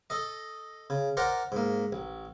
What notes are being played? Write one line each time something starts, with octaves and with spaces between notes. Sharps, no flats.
A4 D#5
C#3
A#4 C5 D5 F#5 A#5
G#2 A#3
A1